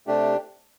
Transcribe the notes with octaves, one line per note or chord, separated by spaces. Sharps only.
C3 A3 D4 G4